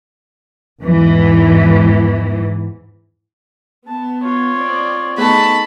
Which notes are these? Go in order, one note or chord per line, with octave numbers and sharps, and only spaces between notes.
E2 G#2 E3
B3 A5
F4 C#5
C4 D5
A3 B3 D#4 G#4 A4 A5 B5 C#6